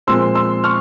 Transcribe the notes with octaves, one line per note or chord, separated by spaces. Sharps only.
A#2 F3 G#3 C4 C6 E6
C6 E6
C#6 F6